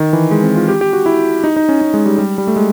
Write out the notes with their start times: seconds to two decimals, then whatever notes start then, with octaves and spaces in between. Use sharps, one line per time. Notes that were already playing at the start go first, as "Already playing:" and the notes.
Already playing: D#3
0.13 E3
0.31 G#3
0.43 C4
0.56 F4
0.68 G4
0.81 G4
0.93 F#4
1.06 E4
1.44 D#4
1.56 D#4
1.69 C#4
1.81 C#4
1.94 G#3
2.06 G3
2.18 G3
2.38 G3
2.47 A3
2.56 G#3